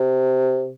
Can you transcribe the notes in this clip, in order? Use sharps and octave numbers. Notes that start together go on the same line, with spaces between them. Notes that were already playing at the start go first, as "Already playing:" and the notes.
Already playing: C3